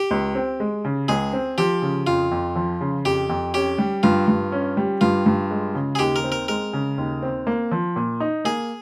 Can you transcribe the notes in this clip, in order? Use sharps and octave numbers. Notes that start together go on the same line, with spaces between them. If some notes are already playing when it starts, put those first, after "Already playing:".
Already playing: G4
C#2
C4
G#3
C#3
C#2 G#4
C4
F3 G4
C#3
F2 F4
F2
F3
C#3
F2 G4
F2
C#4 G4
G3
G2 F4
G2
C#4
G3
G2 F4
G2
G#3
C#3
G#4
D#2 G4
A#4
C4
A#4
G#3 A#4
C#3
D#2
C4
A#3
F3
A#2
D#4
A#3 G#4